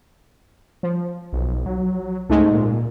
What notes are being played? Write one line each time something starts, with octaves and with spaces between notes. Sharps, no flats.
F3
B1
F#3
C#2 G#2 G#3 A3
A#2